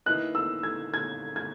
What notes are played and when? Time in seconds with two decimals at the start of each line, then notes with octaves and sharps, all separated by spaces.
0.06 D#3 A#3 E4 B4 D#5 F#6
0.35 E6
0.63 G#6
0.94 G#6
1.36 G#6